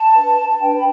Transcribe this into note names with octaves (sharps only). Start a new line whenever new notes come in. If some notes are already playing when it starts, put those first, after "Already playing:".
Already playing: A5
D4 B4
A5
D4 B4 G5
B5